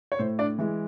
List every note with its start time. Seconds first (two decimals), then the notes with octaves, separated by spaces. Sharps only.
0.12 C#5
0.19 A2 C5
0.39 D4 D5
0.59 E3 G#3